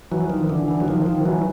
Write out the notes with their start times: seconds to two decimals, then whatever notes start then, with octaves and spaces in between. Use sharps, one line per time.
0.12 E3 F#3
0.30 D#3 F3
0.49 D3 E3
0.68 D3 E3
0.80 F#3
0.88 D#3 F3
1.06 D#3 F3
1.26 E3 F#3